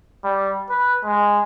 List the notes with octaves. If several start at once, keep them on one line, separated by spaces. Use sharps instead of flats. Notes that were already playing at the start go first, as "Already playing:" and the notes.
G3
B4
G#3